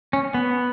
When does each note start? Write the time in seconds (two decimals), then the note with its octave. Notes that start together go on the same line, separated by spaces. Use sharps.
0.13 C#4
0.34 B3